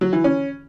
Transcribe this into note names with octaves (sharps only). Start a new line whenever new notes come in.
F#3
E3
C#4